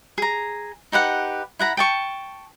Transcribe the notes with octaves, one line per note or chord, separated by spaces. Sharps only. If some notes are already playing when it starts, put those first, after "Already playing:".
G#4 A#5
D#4 G4 B4 F#5
E4 F#5 A#5 B5
G5 A5 C#6